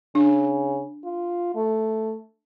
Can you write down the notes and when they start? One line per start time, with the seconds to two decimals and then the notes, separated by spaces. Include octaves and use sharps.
0.15 C#3 D4
1.04 F4
1.55 A3